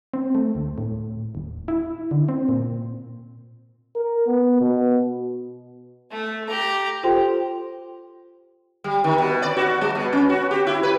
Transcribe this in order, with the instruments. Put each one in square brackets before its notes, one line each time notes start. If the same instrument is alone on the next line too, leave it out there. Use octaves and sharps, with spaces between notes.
[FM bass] C4
A3
D2
A2
D#1
E4
D3
C4
A#2
[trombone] A#4
B3
B2
[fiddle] A3
G4 A#5
[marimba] F4 G4 A4 C5 G5 C6
[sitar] G3
D#3
B2
D5
F#4
G3
B2
C#4
F#4
G4
E4
B4